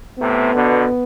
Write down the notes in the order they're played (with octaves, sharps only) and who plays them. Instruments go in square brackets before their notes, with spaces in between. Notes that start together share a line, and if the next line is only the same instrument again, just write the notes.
[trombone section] A2 C3 [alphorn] B3
[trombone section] B2 D3